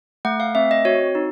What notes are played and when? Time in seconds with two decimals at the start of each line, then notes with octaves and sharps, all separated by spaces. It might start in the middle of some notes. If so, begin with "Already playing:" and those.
0.25 A3 F#5
0.40 F5
0.55 C4 E5
0.71 D#5
0.85 F#4 C#5
1.15 D#4